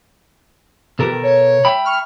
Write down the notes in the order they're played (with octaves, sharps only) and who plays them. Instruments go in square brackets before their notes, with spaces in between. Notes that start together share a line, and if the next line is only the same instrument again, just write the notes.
[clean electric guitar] B2 A4 A#4 [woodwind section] E3 F4 G4
[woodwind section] D#3
C#5
[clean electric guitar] E5 G5 B5
[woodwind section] C#6 F6